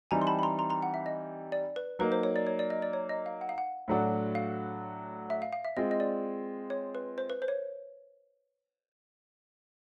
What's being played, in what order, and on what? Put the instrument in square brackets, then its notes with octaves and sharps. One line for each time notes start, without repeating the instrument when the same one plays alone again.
[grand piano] E3 G3 C4 D#4 [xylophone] G#5 A#5
[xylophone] C6
A5 B5
B5
A#5 C6
A#5 C6
A#5 C6
F#5
E5
D#5
D5
B4
[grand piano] F#3 A#3 D#4 [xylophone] B4
[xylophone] C5
C#5
D5
C#5
D5
D#5
D5
C#5
D#5
F5
F#5
F5
F#5
[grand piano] A2 F#3 A3 D4 F#4
[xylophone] F5
E5
F5
F5
E5
[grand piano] G#3 C4 F4 [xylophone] D#5
[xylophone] D#5
D5
C#5
B4
C5
B4
C5
C#5